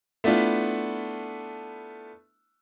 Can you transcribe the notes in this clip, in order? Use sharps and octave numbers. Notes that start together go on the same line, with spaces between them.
A3 B3 D4 E4 F4